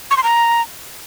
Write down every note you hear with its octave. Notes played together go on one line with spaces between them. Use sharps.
C#6
C6
A#5